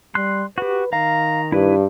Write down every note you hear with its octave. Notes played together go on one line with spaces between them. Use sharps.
G3 C6 F#6
F#4 G4 B4
D#3 F5 A#5
G2 E4 B4